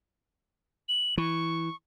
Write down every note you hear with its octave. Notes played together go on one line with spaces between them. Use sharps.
F#7
E3 C#6